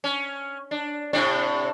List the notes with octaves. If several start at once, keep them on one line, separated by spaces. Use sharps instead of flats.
C#4
D4
A2 C3 D4